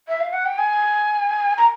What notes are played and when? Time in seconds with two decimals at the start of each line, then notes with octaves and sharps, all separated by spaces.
0.07 E5
0.20 F5
0.32 F#5
0.45 G5
0.57 G#5
1.57 A#5